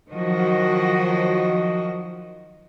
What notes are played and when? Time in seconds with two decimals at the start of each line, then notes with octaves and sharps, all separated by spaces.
0.10 D#3 F3 F#3 F#4 D#5